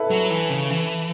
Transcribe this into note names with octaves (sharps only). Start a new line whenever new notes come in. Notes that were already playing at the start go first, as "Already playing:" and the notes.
Already playing: E4 A4 B4
F#3
E3
C#3
E3